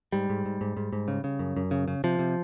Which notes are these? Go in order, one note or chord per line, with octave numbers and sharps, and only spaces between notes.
G#2 G3
G#2
G#2
G#2
G#2
G#2
C#3
C#3
F#2
F#2
C#3
C#3
C3 F3
C3